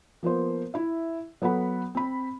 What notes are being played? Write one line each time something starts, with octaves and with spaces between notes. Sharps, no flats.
F3 A#3 B3 C5
E4 E5
F#3 B3 A4 F#5 B5
C4 B5